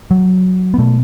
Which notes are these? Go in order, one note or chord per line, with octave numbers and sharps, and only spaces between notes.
F#3
B3
B2 A3